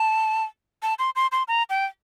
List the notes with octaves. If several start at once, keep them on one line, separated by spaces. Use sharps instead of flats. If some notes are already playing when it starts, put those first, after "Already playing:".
Already playing: A5
A5
C6
C6
C6
A#5
G5